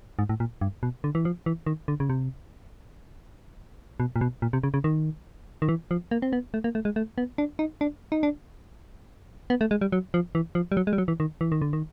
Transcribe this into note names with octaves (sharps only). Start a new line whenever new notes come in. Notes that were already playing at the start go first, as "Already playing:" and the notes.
G#2
A2
A#2
G2
B2
D3
E3
F3
E3
D#3
D3
C#3
C3
B2
A#2
B2
A#2
C3
C#3
C#3
D#3
D#3
E3
F3
A#3
C4
B3
A3
A#3
A3
G#3
A3
B3
D4
D#4
D4
D#4
D4
B3
A3
G#3
G3
F#3
F3
E3
F3
G3
F#3
G#3
G3
F#3
E3
D#3
E3
D#3
D3
D#3